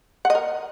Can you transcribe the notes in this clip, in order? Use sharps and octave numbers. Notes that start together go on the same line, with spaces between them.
F#5
D#5
A#4